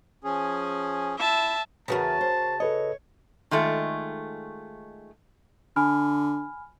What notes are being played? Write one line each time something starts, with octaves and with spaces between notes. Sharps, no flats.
F3 C#4 G#4
E4 E5 A5
E2 C#3 F#4 A#4 B4 E5 A5
C5
A4 B4 C#5 D#5
D#3 G#3 A3 F4
D3 G#5 B5 F6